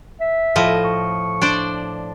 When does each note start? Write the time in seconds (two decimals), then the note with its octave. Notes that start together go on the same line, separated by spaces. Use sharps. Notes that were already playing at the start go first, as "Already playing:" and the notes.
0.20 E5
0.56 A2 F3 D#5
0.84 C#6
1.42 D4 C5 D5